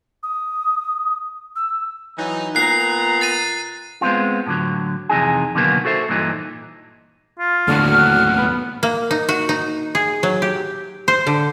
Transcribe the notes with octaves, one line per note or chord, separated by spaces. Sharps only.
D#6
E6
E3 F#3 D#4
A#2 B3 A#5 F#6 C7
A6 C7 D#7
G#3 B3 C4 D#4 F4
A2 D3 F#3
F2 C3 E3 D#4 G#4
B2 D3 D#3 F#3 A#3 B3
F#4 A4 C5 E5
G2 A#2 E3 D#4
F4
D#2 A2 D3 F#4 F6
F#5
B3
A#3
D#4
F#4
D#4
G#4
F#3
G4
C5
D3